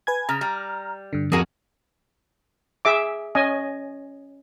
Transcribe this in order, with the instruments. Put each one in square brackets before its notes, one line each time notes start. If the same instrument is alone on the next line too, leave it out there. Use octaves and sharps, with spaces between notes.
[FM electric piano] B4 G#5 G#6
[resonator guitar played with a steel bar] C#3 [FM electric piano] A#5 F6
[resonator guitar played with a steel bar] G3
[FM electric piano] G2 D3
[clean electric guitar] F2 F#4 [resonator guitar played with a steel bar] G#4 A#4 G#5
[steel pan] G#4 E5 D6
C#4 D#5 G#5